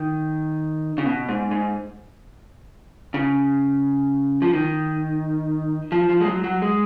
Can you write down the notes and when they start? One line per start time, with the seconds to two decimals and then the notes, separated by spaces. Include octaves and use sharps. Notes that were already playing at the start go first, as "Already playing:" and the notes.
Already playing: D#3
0.98 C#3
1.05 B2
1.28 G#2
1.51 G#2
3.14 C#3
4.42 F3
4.53 D#3
5.92 F3
6.09 F3
6.20 G#3
6.26 F#3
6.44 F#3
6.62 G#3